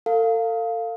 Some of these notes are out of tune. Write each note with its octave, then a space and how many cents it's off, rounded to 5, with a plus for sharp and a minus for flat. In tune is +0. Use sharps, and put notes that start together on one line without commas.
A4 +40 F5 +0